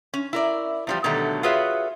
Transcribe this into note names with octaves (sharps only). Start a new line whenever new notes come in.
C#4
E4 A#4 D5
E2 F3 G3
B2 D3 D#3 F#3 G3 A3
F4 F#4 G#4 B4 C#5 E5